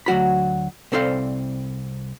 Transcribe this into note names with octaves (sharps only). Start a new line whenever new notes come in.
D2 F#3 F#4 B5
C2 C4 A4 C5 D5 F5